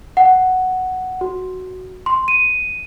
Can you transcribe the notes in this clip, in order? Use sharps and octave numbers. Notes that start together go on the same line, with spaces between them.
F#5
F#4
C6
D#7